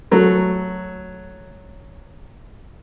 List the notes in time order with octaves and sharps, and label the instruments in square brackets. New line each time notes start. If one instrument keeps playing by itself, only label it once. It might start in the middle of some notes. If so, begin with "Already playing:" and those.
[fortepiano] F#3 A3